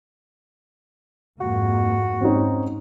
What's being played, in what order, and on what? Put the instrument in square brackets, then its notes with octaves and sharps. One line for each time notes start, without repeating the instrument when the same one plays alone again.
[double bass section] F2 G#2 A#3 [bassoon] F#4
[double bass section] G#2 [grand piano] C4 C#4 D#4